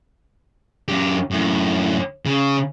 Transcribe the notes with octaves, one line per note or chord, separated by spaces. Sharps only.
F#2 G4
F#2 A2
C#3